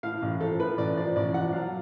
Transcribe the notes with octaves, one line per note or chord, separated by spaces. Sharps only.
A2 F5
A1
F3 A4
A2 B4
A1 D5
F3 D5
A1 D5
F3 F#5
F#3 F5